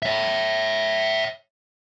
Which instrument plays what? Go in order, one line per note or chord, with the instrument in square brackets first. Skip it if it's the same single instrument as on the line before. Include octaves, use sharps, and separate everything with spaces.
[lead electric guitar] C#5 E5